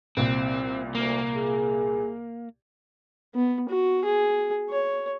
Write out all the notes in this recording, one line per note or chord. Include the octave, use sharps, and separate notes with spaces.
C2 A#2 C4
D2 A#3
G#4
B3
F#4
G#4
C#5